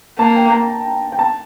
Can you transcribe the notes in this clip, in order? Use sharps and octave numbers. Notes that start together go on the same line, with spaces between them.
A#3 A5
G5
A#5
G5
A5